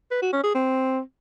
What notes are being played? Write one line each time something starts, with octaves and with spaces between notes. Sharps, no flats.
B4
F#4
C#4
G#4
C4